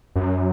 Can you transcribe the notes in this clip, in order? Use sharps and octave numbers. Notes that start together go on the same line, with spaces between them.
F#2